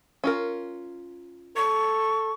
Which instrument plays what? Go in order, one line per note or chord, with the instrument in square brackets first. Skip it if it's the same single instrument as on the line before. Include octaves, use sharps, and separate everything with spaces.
[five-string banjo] C#4 F4 A#4
[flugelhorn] A4 [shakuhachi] C#6